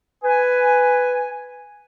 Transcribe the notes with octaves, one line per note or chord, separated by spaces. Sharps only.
B4 G#5